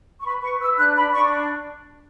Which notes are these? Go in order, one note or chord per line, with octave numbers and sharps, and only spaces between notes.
C#6
B4 B5
B4 C#6
B4 E6
D4 F#6
D4 B5
D4 C#6